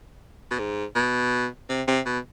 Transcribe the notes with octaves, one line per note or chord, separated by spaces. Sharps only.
B2
G#2
B2
C3
C3
B2